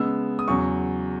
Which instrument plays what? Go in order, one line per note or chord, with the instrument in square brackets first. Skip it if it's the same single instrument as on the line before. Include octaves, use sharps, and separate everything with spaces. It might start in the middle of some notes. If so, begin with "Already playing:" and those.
Already playing: [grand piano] C#3 G#3 B3 E6
D#6
E2 C#3 F#3 C#6